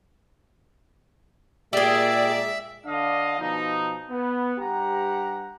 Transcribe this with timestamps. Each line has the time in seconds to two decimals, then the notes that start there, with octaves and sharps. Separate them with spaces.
1.73 A#2 G#3 G4 G#4 D5 E5 E6
2.85 D3 D4 D#5 F5
3.39 B2 F3 D#4
4.10 B3
4.60 G2 G4 F#5 A#5